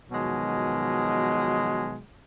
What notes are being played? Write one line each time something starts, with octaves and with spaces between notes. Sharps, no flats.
B2 D#3 F3 F#3 G#3